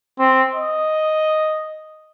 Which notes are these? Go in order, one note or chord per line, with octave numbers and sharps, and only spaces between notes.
C4
D#5